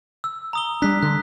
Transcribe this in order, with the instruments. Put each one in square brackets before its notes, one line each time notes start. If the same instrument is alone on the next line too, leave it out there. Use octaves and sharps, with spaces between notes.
[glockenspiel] E6
A#5 D#6 G7
[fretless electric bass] G3 D4 [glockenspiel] A#5 F#6 B6
[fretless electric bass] D3 [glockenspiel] F#6